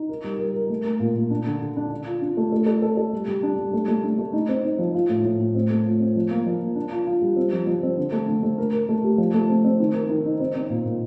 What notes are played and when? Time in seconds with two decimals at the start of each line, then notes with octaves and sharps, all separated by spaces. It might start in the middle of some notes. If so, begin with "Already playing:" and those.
Already playing: D#4
0.09 A#4
0.24 G3
0.39 A#4
0.54 A#4
0.69 A3
0.84 A#4
1.00 A#2
1.15 A#2
1.30 D4
1.46 D3
1.61 D3
1.77 D4
1.91 D4
2.06 F4
2.22 D4
2.37 A3
2.52 A4
2.66 A4
2.82 A4
2.97 A4
3.13 G3
3.28 G3
3.43 D4
3.58 G3
3.73 A3
3.88 A3
4.03 D4
4.18 A3
4.33 D#4
4.49 C4
4.65 D#4
4.79 F3
4.94 F4
5.09 A2
5.25 A2
5.40 A2
5.55 C4
5.70 A3
5.86 F4
6.00 C4
6.16 F3
6.31 A#3
6.47 F3
6.61 A#3
6.76 D4
6.92 F4
7.07 F4
7.22 G3
7.36 C4
7.53 F3
7.67 F3
7.83 C4
7.97 D3
8.12 A3
8.27 D3
8.43 A3
8.58 A#4
8.73 A#4
8.89 A3
9.04 G4
9.18 F3
9.34 A3
9.49 C4
9.64 C4
9.80 D#3
9.94 A#4
10.09 D#3
10.25 D#4
10.40 C4
10.55 C4
10.70 A#2
10.85 A#2